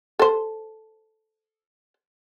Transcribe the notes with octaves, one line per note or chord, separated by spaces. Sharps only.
A4 C5